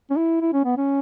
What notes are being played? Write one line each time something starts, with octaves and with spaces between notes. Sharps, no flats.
C#4
E4
E4
C#4
B3
C#4